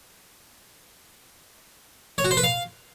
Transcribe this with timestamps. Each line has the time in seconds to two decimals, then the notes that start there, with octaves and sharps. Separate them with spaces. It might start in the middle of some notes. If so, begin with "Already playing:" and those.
2.18 C#5
2.25 F#4
2.31 C5
2.37 B4
2.44 F5